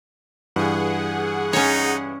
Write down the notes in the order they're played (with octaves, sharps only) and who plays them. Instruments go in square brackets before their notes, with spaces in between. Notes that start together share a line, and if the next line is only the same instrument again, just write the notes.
[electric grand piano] G2 E3 [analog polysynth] G#4 F#5
[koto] C#4 C#5 [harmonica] D#4